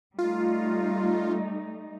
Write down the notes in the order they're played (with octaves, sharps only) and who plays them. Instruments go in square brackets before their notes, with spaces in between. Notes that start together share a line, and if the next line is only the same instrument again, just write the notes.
[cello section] G3 A3 D#4 [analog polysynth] F4